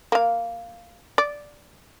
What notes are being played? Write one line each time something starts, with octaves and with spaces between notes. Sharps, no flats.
A#3 F5
D5